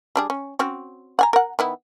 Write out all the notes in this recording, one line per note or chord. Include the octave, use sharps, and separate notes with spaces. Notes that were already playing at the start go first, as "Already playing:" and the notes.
G3 D4 G#4
C#4
C4 C#4 F#4
F#5 G#5 A#5
A#4 F#5
D#3 B3 E4